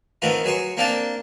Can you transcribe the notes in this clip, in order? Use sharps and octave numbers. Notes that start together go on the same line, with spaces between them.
D#3 A3 B3 C4 F4
F#3 G#4 C#5 C6
A#3 C4 D4 D5 F5 A5